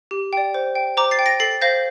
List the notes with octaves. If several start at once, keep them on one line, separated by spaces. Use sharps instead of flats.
G4
D5 G5
C5
G5
C5 A#5 D6
A6 C7
G5
A#6 D7
A4 A6 C7
C5 F5 G6 A#6